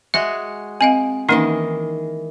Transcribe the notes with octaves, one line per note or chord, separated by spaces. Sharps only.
G#3 F#4 G#4 E5
C4 D#5 F5 G#5
D#3 E3 A#3 C#4 D#4 D#5